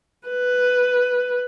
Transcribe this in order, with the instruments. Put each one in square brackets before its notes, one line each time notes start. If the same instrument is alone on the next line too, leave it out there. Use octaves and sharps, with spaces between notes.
[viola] B4